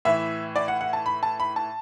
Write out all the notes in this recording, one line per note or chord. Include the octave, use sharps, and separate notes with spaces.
A2 E3 E5
D5
F#5
F#5
A5
B5
A5
B5
A5